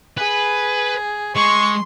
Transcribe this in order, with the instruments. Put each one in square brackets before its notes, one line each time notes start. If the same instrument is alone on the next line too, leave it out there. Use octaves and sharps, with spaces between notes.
[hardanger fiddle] G#4 [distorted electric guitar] B4
[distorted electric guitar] G#3 [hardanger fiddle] C6 [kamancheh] C#6